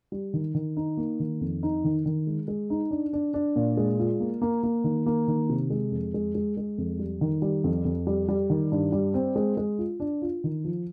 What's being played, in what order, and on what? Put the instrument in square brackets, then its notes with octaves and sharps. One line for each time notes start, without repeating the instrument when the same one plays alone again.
[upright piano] G3
D#3
D#3
D#4
A#3
D#3
F2
D#4
D#3
D#3
G#3
G#3
D#4
D4
D4
D4
A#2
G#3
F4
A#3
A#3
A#3
D#3
A#3
D#3
C3
G#3
F2
G#3
G#3
G#3
F2
G3
D#3
G3
F2
F2
G3
G3
D#3
G2
G3
C4
G#3
G#3
F4
D4
F4
D#3
F3